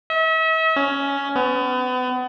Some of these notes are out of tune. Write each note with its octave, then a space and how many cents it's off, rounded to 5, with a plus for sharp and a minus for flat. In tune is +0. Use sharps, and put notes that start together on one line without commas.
E5 -40
C#4 +10
B3 +35